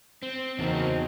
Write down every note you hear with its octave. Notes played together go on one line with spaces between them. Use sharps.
C4
E2 C#3 F#3 A#3 C4 C#4 D#4 A5